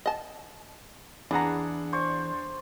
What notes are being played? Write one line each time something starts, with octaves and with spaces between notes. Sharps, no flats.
D#5 A5
E2 E3 B3 D4 G#4 F#5 A#5
C5 D5 C#6